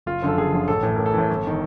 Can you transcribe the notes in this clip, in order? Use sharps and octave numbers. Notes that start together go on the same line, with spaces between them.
F#1 F4
F#2 D3 F3 A4
F#1 G#4
F#2 D3 F3
A1 A4
A2 E3 A4
A1 A#4
A4
A2 E3
G1
D#3